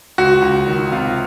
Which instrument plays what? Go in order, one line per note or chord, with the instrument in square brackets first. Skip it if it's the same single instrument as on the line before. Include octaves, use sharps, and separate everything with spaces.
[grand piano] C#2 F#4
C#2
D#3
C3 F4